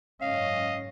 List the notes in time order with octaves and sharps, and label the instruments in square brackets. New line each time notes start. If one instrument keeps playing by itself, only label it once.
[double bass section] F#1 G#2 C#4 [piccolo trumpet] D#5 [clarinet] F5